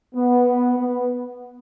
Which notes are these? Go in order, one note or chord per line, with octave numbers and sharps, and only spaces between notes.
B3
B3